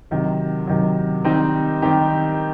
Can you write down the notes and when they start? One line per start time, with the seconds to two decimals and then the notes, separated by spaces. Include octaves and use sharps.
0.11 C3 D#3 F#3
0.67 C3 D#3 F#3
1.25 D#3 G3 C4 D#4 G4
1.82 D#3 G3 C4 D#4 G4